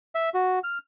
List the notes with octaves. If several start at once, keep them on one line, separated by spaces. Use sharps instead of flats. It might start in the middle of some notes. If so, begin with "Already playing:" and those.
E5
F#4
F6